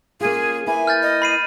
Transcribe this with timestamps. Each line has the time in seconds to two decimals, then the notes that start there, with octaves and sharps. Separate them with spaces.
0.21 A#3 C#4 F4 G#4
0.67 A#3 E4 B4 G#5
0.87 F6 G6 A6
1.03 D#5
1.22 B5 C7 D#7